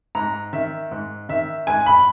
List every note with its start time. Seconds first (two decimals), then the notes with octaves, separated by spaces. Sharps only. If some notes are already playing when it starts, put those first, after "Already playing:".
0.15 G#2 A#5
0.53 D#3 E5
0.91 G#2
1.29 D#3 E5
1.67 G#2 G#5
1.86 B5